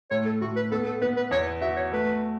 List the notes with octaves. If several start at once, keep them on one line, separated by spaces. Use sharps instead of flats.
A2 C#5
A4
A2 F#4
B4
B3 A4
A4
B3 B4
B4
E2 C#5
F#4 E5
C#5
A3 B4